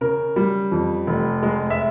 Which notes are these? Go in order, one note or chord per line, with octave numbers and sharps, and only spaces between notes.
C#3 A#4
G3
F2
F1
G#3
E5